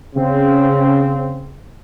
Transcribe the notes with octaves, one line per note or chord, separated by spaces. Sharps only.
C#3 C4